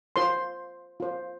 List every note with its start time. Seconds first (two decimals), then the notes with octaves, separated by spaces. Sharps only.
0.16 F4 C5 C6
1.00 F4 C5